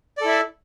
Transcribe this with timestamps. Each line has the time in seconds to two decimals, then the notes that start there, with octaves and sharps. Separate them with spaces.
0.18 D5
0.21 A4
0.25 E4
0.28 E5